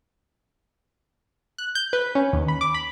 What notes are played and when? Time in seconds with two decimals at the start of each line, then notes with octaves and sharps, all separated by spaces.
1.58 F#6
1.75 G6
1.93 B4
2.15 C#4
2.33 D#2
2.48 B5
2.61 D6
2.74 B5